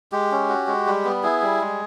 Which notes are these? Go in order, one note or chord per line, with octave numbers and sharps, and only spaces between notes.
G#3 G4
C#4
F#4
G#3
G3
B3
E4 G#4
G3
G#3